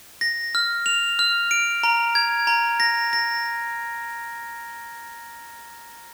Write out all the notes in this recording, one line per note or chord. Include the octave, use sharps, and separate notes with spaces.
A#6
F6
F7
F6
D7
A#5
G#6
A#5
A#6
A#6